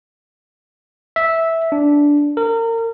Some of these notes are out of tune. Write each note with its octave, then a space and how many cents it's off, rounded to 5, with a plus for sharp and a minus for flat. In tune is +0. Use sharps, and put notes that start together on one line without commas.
E5 -10
D4 -10
A#4 -30